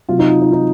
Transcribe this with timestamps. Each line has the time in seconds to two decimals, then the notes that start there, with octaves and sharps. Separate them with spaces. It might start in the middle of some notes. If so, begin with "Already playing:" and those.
0.09 C3 F#3 F4
0.19 D#4
0.30 F4
0.41 D#4
0.52 D#4